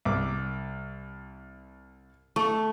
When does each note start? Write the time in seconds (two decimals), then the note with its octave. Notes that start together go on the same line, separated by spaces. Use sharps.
0.05 C2 D6
2.36 A3 C#6